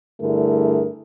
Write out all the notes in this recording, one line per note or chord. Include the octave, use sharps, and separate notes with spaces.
G2 D3 A3 E4 G#4 A#4